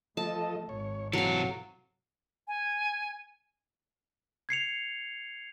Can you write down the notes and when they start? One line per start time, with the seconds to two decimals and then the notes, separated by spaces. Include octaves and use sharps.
0.17 F3 A3 A4 D#5 A5
0.69 G#1 C#5
1.13 C3 E3 F#3 A4 F5
2.48 G#5
4.49 G#6 C7 C#7 F7